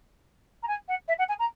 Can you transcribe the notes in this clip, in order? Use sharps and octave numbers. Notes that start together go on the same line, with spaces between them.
A#5
G#5
F#5
E5
F#5
G#5
A#5